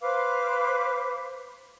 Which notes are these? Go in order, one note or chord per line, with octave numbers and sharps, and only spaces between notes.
B4 C5 F5 D6